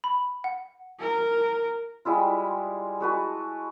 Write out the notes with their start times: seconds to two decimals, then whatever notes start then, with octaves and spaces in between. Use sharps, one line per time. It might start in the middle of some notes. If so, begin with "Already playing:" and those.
0.04 B5
0.44 F#5
1.00 A#4
2.05 G3 G#3 E4 F4
3.00 G#3 F#4 B4 A5